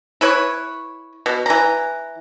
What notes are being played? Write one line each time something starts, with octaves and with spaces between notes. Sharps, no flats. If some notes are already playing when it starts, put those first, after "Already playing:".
E4 B4 C#5
B2
E3 A#5